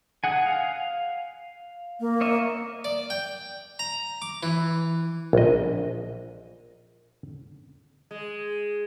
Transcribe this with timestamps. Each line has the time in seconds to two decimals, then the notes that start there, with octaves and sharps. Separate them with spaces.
0.24 G#4 F#5 G#5
0.46 F5
2.00 A#3
2.21 C#5 D#5 E5
2.84 D5
3.10 G5
3.79 A#5
4.22 D6
4.43 E3
5.33 A#1 D#5
8.11 G#3